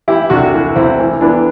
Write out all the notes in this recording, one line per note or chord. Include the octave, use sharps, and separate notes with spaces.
E3 E4 G4
C2 D4 F#4
E3
C2 C4 E4
E3
E3 B3 D4